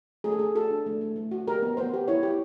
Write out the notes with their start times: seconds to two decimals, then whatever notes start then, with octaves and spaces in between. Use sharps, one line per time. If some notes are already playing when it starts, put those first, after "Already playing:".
0.24 A3 G#4
0.32 A4
0.39 A3 G#4
0.55 F#4 A4
0.71 D4
0.86 A3
1.01 A3
1.16 A3
1.31 F#4
1.48 G4 A#4
1.62 B3
1.77 B3 C5
1.94 G4
2.08 E4 C#5
2.23 G4